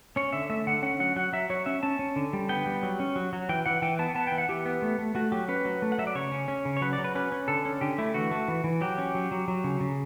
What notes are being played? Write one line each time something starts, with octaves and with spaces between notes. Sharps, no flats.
C#4 C#5
D3 E5
A3 E5
D3 F#5
C#4 F#5
F#3 F#5
F#3 F#5
F#3 E5
F#3 C#5
C#4 E5
C#4 A5
C#4
D3
G3
B3 G5
G3
F#3
C#4
F#3
F#3
E3 G5
E3 F#5
E3 G5
B3 A5
B3 A5
G5
E3
F#5
E3 G4
B3
A3
A3
A3 F#4
F#3 G4
C#4 B4
F#3
A3
F#5
F#3 E5
D5
C#3 C#5
C#4
C#4
C#3
C#5
F#3 B4
D5
F#3
B4
C#4 B4
C#4
D3 A4
C#4
D3 G4
A3 E4
E3 F#4
A3
E3
E3
F#3 G4
C#4
F#3
F#3
F#3
C#3
C#3